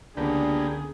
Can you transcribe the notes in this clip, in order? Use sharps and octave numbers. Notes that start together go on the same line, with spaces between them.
C#2 D3 A#3 B3 D4 G4 G#4